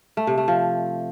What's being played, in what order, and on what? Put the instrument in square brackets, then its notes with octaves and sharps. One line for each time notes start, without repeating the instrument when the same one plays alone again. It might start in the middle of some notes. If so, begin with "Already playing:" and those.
[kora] A3
C3
A3
F3